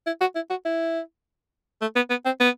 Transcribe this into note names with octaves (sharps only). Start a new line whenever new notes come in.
E4
F#4
E4
F#4
E4
A3
B3
B3
C4
B3